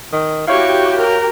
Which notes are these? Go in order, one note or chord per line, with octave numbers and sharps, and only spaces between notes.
D#3
E4 F#4 G4 C#5 F5 G5 C#6
A#4 A#5